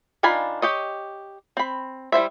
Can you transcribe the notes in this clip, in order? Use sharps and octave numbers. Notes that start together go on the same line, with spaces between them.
D#3 D4 F4 G#5 B5
G4 C#5 D#5
C4 B5
G3 E4 C5 E5